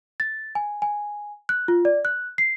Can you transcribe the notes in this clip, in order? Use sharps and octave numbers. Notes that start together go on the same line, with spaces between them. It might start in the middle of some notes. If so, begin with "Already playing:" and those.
A6
G#5
G#5
F#6
F4
D5
F#6
C7